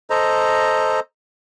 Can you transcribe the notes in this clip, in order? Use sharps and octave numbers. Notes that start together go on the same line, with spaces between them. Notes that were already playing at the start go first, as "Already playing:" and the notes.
A4 C5 D#5 A#5